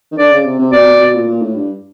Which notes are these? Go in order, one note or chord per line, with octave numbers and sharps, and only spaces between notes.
D#3
D3 D5
C#3
C3
C3
B2 D5
B2
B2
A#2
A#2
A2
G2